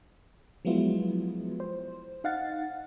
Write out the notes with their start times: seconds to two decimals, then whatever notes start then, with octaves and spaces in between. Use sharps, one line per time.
0.65 F3 F#3 G#3 B3 E4 F4
1.60 C5
2.24 D#4 F5 F#5 A6